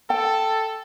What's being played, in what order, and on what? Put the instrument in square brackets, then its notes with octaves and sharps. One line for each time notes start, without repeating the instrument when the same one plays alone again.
[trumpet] A4 [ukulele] G5